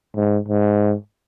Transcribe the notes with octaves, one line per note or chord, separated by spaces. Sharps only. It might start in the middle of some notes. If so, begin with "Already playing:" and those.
G#2
G#2